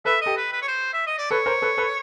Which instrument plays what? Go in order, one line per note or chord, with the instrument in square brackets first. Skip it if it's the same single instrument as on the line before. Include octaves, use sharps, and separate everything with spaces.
[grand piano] A4 B4 [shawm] E5
[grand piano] G4 A4 [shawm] D#5
[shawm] B4
B4
C#5
C5
E5
D#5
D5
[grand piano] A4 B4 [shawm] C#5
[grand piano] A#4 C5
A4 B4
A4 B4